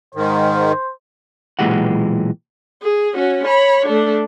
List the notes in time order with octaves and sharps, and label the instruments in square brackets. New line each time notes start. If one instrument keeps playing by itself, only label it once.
[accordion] G#2 D#3 [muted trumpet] C5
[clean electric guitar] B1 A#2 E3 G#3 G4 F#5
[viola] G#4
C#4 F#4
C#5 B5
A3 D4